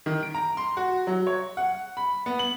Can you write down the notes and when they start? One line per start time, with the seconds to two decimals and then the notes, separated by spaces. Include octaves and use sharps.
0.06 D#3
0.23 D7
0.35 A#5
0.57 C6
0.77 F#4
1.07 F#3
1.27 C#5
1.57 F#5
1.97 B5
2.26 B3
2.39 F#7